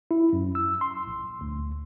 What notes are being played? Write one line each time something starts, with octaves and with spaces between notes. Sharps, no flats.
E4
F#2
E6
C6
A#1
D2